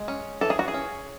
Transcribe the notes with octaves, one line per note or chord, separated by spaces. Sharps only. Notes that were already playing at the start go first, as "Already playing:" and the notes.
Already playing: G#3
C#4
E3 A4
G#4
F#4
G#4
C#4